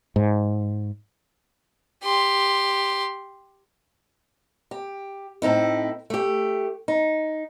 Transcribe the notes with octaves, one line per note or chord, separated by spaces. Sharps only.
G#2
G4 C6
G4
A2 C4 D#4 E4
A3 G4
D#4